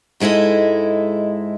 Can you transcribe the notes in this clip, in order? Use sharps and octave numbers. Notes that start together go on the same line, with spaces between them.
G#2 G#3 E4 A4 D#5